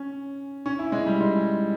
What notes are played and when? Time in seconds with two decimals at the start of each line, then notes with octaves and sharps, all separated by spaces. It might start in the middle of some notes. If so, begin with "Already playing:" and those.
Already playing: C#4
0.66 C#4
0.79 E4
0.92 G#3
1.06 G3
1.21 G#3